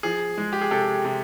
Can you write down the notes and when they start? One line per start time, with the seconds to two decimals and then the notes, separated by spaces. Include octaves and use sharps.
0.03 F3 G#4
0.38 G#3
0.52 G4
0.61 G#4
0.71 C3 G4 A4
1.05 C3